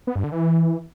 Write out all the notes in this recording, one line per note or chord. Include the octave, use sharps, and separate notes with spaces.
B3
G2
D3
E3